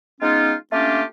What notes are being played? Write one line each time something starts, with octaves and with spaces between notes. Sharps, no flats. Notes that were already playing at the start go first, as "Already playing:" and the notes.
G#3 B3 C#4 D#4 F4
A3 A#3 C#4 D4 F4 G4